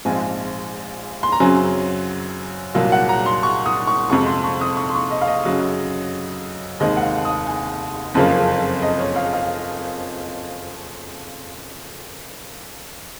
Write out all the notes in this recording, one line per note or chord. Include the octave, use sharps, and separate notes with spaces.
A#1 G#2 F3 G#3 C4 G#5
C6
A#5
F#2 C#3 F#3 C4 G#5
C2 A#2 F#3 A#3
F#5
A#5
C6
C#6
D#6
C#6
F2 C3 F3 G#3 C#6
C6
C#6
D#6
C#6
C6
C#6
D#5
F5
D#5
F#2 C#3 F#3
F1 D#2 D#3 G#3 C4 D#5
F#5
F5
D#6
G#5
F#1 F2 C#3 F3 A#3
D#5
C#5
F5
F5